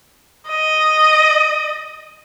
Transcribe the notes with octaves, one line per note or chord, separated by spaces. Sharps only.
D#5